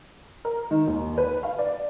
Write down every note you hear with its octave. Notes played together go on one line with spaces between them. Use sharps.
A#4
D#3
D#2
B4
F5
D5